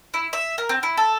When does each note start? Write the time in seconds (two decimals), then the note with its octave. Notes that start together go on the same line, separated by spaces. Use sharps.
0.14 E4
0.33 E5
0.58 A#4
0.69 C4
0.83 E4
0.97 A4